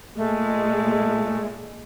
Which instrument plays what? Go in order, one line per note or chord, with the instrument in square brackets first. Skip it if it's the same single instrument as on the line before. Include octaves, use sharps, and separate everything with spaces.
[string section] A#2 G#3 [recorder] A3